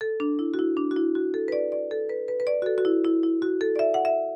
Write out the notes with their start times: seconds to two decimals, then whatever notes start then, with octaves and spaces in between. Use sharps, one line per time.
0.01 A4
0.20 D4
0.39 E4
0.54 F#4
0.59 E4
0.77 D4
0.91 F#4
0.97 E4
1.15 F#4
1.34 A4
1.48 B4
1.52 D5
1.72 D5
1.91 A4
2.09 B4
2.28 B4
2.40 B4
2.47 D5
2.62 F#4
2.66 A4
2.78 F#4
2.85 E4
3.04 E4
3.23 E4
3.42 F#4
3.61 A4
3.76 D5
3.79 E5
3.94 F#5
4.05 E5